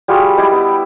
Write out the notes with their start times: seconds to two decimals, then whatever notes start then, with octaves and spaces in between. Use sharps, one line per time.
0.08 G3 F4 F#4 G#4
0.37 E4 G4 C5 D#5
0.52 B3 E4